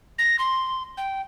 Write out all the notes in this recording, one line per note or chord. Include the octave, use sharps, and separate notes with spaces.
A#6
C6
G5